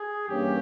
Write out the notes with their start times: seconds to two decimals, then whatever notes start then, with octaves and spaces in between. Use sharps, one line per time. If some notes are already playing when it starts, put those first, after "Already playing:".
Already playing: G#4
0.27 G2 E3 A#3 C#4 G4